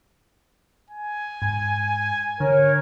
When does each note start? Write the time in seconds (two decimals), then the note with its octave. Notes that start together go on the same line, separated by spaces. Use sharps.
0.90 G#5
1.42 G#2
2.40 D3 A#4 C#5